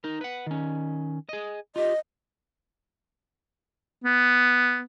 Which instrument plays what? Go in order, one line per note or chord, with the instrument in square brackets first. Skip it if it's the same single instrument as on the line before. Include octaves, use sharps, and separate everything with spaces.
[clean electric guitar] D#4 A#4
B4 F#5
D#3 C#4
G#4 D#5
[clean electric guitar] F4 G4 [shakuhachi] D#5
[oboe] B3